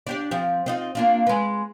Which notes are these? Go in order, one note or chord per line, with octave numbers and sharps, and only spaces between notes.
D4 G4 D5
F3 C4 G4
C4 D#4 F4
A#3 D4 F4
G#3 B4